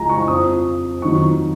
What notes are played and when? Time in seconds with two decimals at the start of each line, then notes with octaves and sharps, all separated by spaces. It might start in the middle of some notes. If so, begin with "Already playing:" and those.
Already playing: C#2 C#3 F3 G#5 A#5
0.09 C#6
0.28 F2 F3 D#6
1.02 F2 D#3 F#3 C#6